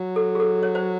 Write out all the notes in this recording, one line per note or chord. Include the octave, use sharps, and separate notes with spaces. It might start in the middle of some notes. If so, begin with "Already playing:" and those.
Already playing: F#3
A4
G#4
A4
C#5
C5